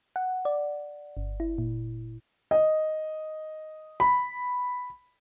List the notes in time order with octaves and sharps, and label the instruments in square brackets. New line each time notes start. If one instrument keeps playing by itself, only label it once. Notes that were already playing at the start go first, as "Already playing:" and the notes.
[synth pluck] F#5
D5
G1
E4
A#2
[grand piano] D#5
B5